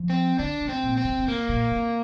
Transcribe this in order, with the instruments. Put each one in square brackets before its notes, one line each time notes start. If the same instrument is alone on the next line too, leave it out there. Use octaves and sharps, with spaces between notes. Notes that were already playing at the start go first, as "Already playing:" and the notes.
Already playing: [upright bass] F3
[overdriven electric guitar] C4
[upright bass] D3 [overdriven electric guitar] D4
[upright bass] C3
[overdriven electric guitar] C4
[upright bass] A#2
[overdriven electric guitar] C4
[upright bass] C3
D3
[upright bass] C3 [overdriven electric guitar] A#3
[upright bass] A#2
C3